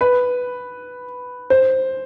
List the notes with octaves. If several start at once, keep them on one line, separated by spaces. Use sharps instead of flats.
B4
C5